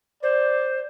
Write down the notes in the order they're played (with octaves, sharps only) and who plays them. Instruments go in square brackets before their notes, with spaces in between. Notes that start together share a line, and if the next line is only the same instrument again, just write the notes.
[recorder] C5 [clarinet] D5